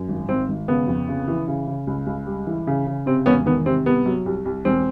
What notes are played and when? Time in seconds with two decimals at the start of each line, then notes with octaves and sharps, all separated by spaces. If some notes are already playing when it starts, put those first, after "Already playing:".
Already playing: F#2
0.09 G#1
0.28 G#1 C4
0.49 G#1
0.68 C#3 B3
0.88 F2
1.08 C#3
1.27 E3
1.48 C#3
1.67 C#3
1.87 C#2
2.07 C#2
2.27 G3
2.47 E3
2.67 C#3
2.87 C#3
3.06 C3 C4
3.26 E1 B3 C#4
3.46 D#3 B3
3.66 C3 C4
3.86 C2 B3
4.06 F#3
4.26 C2
4.45 C2
4.65 E1 C4